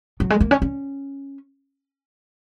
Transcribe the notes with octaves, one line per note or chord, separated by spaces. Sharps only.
F#3
G#3
A#3
C#4
C#4